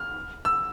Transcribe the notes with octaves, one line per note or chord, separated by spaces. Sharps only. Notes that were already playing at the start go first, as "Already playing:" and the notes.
Already playing: F6
E6